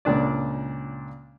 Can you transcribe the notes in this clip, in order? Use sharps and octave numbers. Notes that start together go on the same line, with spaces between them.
C#2 A#2 D4 D5